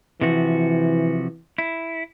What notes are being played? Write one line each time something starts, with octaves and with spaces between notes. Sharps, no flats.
C3 E3 F3 F#4
E4